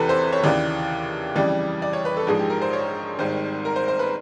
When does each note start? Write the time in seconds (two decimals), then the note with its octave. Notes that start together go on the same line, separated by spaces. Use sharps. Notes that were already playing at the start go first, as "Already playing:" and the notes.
Already playing: E2 C3 E3 A4 B4
0.09 C5
0.33 C#5
0.44 D#2 C#3 E3 D5
1.36 F2 C#3 E3 G3 D5
1.82 D5
1.93 C#5
2.05 B4
2.17 A4
2.27 A#1 G#2 F3 G#3 G#4
2.39 G4
2.50 A#4
2.62 C5
2.73 C#5
3.19 G#1 G#2 D#3 G3 C5
3.65 A#4
3.76 C5
3.88 C5
3.99 B4